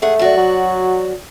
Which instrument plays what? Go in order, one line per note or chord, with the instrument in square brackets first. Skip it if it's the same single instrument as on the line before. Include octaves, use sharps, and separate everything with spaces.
[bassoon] A3 [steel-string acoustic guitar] G#4 F#5
[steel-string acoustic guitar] F#2 F#4 D5
[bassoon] F#3